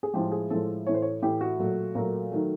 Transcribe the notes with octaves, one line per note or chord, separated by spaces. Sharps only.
G#4
A2 F3 G#3 G4
G#4
A2 F3 G#3 A4
A2 E3 A3 C#5
C5
C#5
A2 E3 A3 G4
F#4
A#2 F#3 A3
A#2 F#3 A3 A#4
D#3 F#3 A3